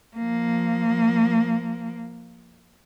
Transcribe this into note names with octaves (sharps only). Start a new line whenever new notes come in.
F3 A#3